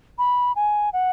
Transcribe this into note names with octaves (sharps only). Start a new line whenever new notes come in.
B5
G#5
F#5